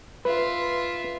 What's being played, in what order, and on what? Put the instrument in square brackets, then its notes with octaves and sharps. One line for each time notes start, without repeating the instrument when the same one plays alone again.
[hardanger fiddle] F4 E5 [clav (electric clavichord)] B4